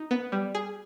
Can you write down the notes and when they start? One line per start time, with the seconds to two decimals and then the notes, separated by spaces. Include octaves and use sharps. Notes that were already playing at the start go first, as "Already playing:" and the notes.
Already playing: D#4
0.11 B3
0.32 G3
0.55 G#4